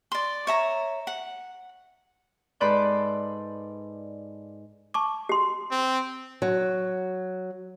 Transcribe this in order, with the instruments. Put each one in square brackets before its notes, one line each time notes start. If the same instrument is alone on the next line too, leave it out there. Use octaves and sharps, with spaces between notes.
[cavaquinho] D5 C6
C#5 E5 A#5
F#5
[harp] G#2 A4 B4 D5 B5 C6
[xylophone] A5 C#6 D6
[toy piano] G4 C6
[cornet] C4
[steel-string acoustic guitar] F#3